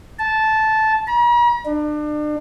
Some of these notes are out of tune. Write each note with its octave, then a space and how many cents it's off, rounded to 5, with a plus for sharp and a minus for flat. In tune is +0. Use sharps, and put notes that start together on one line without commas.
A5 -10
A#5 +45
D4 +35